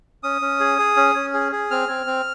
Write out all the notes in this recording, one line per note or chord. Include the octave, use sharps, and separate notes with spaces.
C#4 D#6
C#4
G#4
G#4
C#4
C#4
G#4
G#4
C4 F6
C4
C4